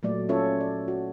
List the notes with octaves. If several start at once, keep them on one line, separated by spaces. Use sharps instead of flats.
A#2 F#3 A3 D5
C#4 F4 A4 C#5 E5
D5
F#4